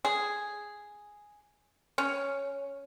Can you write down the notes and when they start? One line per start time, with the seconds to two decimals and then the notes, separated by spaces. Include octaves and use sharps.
0.05 G#4
1.98 C#4